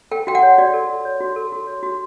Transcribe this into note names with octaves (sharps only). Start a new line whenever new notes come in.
A4 G5
F#4 G5
F#5
C#5
F#4 D5
A4
F#4
C#5
F#4
A4
F#4
C#5
F#4